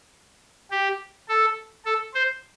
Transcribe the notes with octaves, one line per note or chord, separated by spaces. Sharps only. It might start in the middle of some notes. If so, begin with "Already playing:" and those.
G4
A4
A4
C5